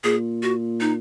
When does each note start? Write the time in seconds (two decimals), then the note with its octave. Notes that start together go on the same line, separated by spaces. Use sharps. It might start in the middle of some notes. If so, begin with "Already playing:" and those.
0.04 A#2 G#4
0.43 F#4
0.80 D#4